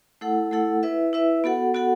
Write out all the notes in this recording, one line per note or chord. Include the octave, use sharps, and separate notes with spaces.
A3 E4 A4 F#5
A3 E4 A4 F#5
E4 B4 E5
E4 B4 E5
B3 F#4 A4 F#5
B3 F#4 A4 F#5